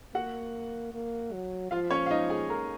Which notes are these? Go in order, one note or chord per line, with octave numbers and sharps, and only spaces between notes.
A#3 F#4 F#5
A#3
F#3
F3 F4 F5
C#4 C#5
F5
D#4 D#5
G#4 G#5
A#4 A#5